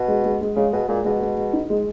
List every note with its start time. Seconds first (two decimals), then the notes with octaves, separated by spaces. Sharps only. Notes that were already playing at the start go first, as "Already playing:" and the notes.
Already playing: B2
0.08 G#3
0.24 G#3
0.41 G#3
0.56 C#3 G#3
0.73 B2 G#4
0.88 A#2 G#3
1.04 B2 G#3
1.21 G#3
1.37 G#3
1.53 D#4
1.70 G#3